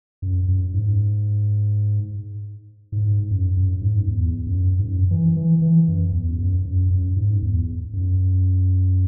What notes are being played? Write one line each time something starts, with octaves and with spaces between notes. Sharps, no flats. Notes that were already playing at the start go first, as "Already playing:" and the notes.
F#2
F#2
G#2
G#2
F#2
F#2
G#2
E2
F#2
G#2
F#2
E3
E3
E3
F#2
E2
F#2
F#2
F#2
G#2
E2
F#2